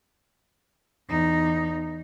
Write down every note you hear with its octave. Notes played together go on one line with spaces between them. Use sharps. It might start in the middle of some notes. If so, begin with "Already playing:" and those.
E2 D#4